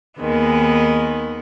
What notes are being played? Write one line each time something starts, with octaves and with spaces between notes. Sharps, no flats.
D#2 D#3 G#3 B3